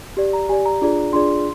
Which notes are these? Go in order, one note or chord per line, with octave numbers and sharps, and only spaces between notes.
G4 D5
A#5
G4 D5 G#5
A#5
D4 F4 G#4 D5
D4 F4 G#4 D5 C6